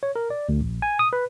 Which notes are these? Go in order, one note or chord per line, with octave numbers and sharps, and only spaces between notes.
C#5
A#4
D5
D2
A#1
G#5
D#6
B4